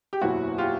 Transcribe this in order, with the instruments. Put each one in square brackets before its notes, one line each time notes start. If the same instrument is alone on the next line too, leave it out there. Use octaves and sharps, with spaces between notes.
[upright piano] G4
F#1 E2 B2 F#3 E4 F#4
F4 G4